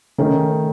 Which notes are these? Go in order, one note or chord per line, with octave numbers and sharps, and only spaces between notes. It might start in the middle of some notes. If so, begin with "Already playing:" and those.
D#3 A3 C#4